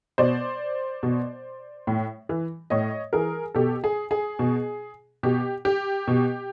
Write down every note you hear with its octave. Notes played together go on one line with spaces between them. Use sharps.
B2 C5 D5
B2
A2
E3
A2 C#5 D#5
E3 G#4 A#4
B2 G4 A4
G#4
G#4
B2
B2 G4
G4
B2